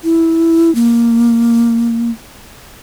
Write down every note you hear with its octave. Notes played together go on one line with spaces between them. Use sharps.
E4
A#3